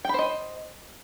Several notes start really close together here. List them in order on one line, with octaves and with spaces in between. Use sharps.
G5 B5 C5 D#5